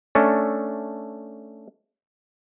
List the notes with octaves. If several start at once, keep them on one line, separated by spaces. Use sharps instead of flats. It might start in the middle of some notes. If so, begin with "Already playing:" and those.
A3 C#4 D4 A4